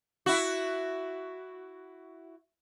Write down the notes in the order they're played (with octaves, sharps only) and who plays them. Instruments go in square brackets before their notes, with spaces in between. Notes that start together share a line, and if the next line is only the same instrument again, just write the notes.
[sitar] E4 F#4